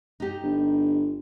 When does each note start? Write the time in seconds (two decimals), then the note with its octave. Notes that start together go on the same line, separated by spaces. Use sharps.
0.20 D#4 G4
0.42 G1